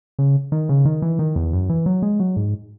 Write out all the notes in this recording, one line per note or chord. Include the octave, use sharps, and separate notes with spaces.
C#3
D#3
C#3
D#3
E3
D#3
E2
F#2
E3
F#3
G#3
F#3
G#2